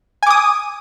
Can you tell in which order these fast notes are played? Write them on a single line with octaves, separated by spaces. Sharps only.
G#5 D6 D#6